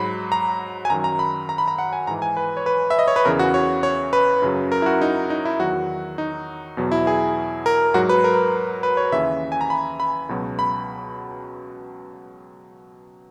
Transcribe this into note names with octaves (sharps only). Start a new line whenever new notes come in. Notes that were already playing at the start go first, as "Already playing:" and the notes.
Already playing: G#2 F#3 B5
A#5
G#5
F#2 D#3 F#3 A#5
A#5
B5
A#5
B5
A#5
F#5
G#5
G#2 E3 A#5
G#5
B4
C#5
B4
E5
D#5
C#5
B4
E2 C#3 E3 A#4
F#4
C#5
C#5
B4
F#2 C#3 F#3
A#4
E4
F#4
D#4
D#4
E4
E2 D#3 F#3 F#4
D#4
E2 B2 F#3
E4
G#4
A#4
G#2 F#3 F#4
B4
A#4
B4
C#5
D#2 C#3 E3 E5
G#5
A#5
B5
B5
C#2 B2 F#3
B5